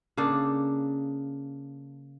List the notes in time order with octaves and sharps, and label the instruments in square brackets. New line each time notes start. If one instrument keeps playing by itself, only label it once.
[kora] C#3 A#3 D4 A4